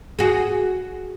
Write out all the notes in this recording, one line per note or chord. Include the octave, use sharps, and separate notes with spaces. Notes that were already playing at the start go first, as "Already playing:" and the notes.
F#4 G#4